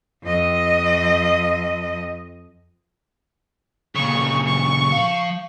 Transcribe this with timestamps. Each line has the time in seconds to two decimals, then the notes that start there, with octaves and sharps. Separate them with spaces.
0.23 F2 D#5
3.95 A#2 C#3 C#6
4.47 C#6
4.92 F3 F5